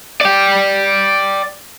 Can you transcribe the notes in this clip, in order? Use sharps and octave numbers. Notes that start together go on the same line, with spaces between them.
D5 G5